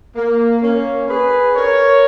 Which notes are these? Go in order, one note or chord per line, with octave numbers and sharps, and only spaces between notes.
A#3
A#3 C#4
G#4 B4
A#4 C#5